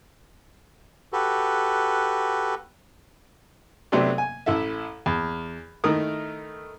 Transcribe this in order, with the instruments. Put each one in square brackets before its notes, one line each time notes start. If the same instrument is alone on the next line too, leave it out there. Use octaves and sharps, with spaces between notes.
[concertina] F#4 G4 A4 B4
[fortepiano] C3 F#3 A3 B3 C4 D4
G#5
A1 E4 A4 E5
E2
D#3 A3 D#4 E4 A#4 D#6